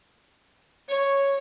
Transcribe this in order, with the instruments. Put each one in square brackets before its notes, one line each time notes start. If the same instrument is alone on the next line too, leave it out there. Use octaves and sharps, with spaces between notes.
[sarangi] C#5